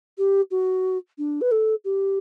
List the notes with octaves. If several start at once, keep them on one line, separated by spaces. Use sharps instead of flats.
G4
F#4
D4
B4
A4
G4